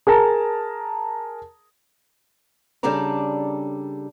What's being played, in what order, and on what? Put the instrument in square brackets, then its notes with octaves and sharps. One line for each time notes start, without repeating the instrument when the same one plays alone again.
[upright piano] G#4 A#4 A5 A#5
[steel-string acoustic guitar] C#3 G3 D4 A4 D5 A#5